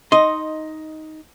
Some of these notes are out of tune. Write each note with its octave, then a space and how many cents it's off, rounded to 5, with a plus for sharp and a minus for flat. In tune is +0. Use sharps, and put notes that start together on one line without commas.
D#4 +5 D#5 +0 C6 +5